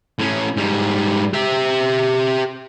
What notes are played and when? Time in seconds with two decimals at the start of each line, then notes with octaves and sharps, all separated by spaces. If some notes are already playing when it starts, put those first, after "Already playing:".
0.19 A2 C#4
0.57 G#2 G3
1.33 G4 E5